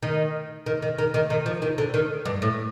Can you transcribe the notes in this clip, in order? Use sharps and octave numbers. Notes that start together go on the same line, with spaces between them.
D#3
D#3
D#3
D#3
D#3
D#3
F3
D#3
D3
D#3
G2
A2